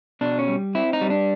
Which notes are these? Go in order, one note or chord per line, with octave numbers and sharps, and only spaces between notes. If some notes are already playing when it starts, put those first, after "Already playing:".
B2 D4
C#4
G3
C4 E4
D#4
G3
D4